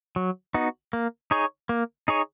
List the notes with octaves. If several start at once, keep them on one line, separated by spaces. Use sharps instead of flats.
F#3
B3 D#4 F#4
A#3
D#4 G#4 C#5
A#3
D#4 G#4 C#5